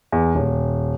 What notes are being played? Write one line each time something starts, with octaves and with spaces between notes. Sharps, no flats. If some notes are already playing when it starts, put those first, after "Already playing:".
E2
D#1